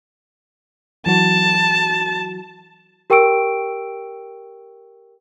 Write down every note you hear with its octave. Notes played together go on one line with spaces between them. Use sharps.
E3 F#3 F#4 A5
G4 A#4 G5 C#6 E6 D7